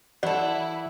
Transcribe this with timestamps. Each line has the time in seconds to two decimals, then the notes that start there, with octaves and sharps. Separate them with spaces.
0.23 E3 E4 A4 D5 F#5